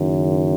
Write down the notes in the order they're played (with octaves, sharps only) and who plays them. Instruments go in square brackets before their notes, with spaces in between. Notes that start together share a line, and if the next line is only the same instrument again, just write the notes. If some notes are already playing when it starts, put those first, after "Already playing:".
Already playing: [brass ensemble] F#1 F#2 D#3